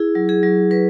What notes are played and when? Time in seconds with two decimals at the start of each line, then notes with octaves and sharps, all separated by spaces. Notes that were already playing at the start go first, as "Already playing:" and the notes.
Already playing: E4 G#4
0.15 F#3
0.29 G#4
0.43 F#3
0.71 F#3 B4